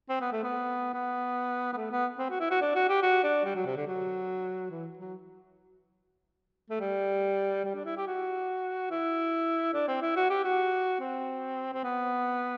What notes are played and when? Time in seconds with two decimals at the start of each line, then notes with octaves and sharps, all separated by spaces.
0.09 C4
0.21 B3
0.32 A3
0.43 B3
0.93 B3
1.73 B3
1.77 A3
1.91 B3
2.18 C4
2.30 F#4
2.40 E4
2.50 F#4
2.61 D4
2.75 F#4
2.89 G4
3.02 F#4
3.23 D4
3.45 G3
3.55 F#3
3.66 C3
3.76 D3
3.87 F#3
4.71 E3
4.99 F#3
6.70 A3
6.80 G3
7.64 G3
7.74 D4
7.85 E4
7.96 G4
8.07 F#4
8.90 E4
9.74 D4
9.88 C4
10.02 E4
10.16 F#4
10.30 G4
10.44 F#4
11.00 C4
11.73 C4
11.84 B3